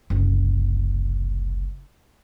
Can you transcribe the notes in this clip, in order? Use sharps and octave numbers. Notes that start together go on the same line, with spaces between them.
F#1 C2